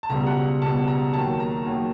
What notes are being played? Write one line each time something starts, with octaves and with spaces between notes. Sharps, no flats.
A5
C#2 B2 G3 A#5
F#5
C#2 B2 G3 A5
A#5
D#2 D#3 F#3 A5
A#5
D#2 D#3 F#3